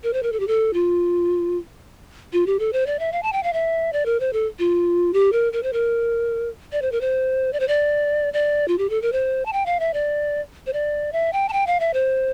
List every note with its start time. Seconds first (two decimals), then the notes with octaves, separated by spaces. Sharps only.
0.03 A#4
0.13 C5
0.23 A#4
0.32 A4
0.40 G4
0.47 A4
0.73 F4
2.33 F4
2.47 G4
2.59 A4
2.73 C5
2.87 D5
2.99 E5
3.12 F5
3.23 A5
3.33 G5
3.43 F5
3.53 E5
3.93 D5
4.06 A#4
4.20 C5
4.33 A4
4.59 F4
5.13 G4
5.32 A#4
5.53 A#4
5.63 C5
5.73 A#4
6.72 D5
6.82 C5
6.92 A#4
7.01 C5
7.53 D5
7.60 C5
7.68 D5
8.33 D5
8.68 F4
8.78 G4
8.90 A4
9.02 A#4
9.12 C5
9.46 A5
9.53 G5
9.66 F5
9.80 E5
9.94 D5
10.67 C5
10.73 D5
11.13 E5
11.33 G5
11.49 A5
11.53 G5
11.67 F5
11.80 E5
11.94 C5